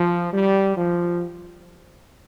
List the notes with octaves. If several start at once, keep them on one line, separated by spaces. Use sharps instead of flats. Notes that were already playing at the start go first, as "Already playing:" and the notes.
Already playing: F3
G3
F3